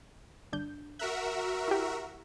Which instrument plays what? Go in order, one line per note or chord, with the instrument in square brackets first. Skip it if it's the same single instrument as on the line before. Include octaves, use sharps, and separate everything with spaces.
[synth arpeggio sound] G1 D4 G6
[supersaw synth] F#4 A#4 E5 [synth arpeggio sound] F#6 B6
[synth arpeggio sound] E4 G4